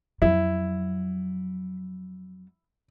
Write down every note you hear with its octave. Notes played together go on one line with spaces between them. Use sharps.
F2 F#3 E4